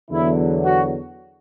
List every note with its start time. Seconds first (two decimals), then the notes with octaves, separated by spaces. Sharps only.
0.11 E2 D3 F#3 E4
0.65 F#4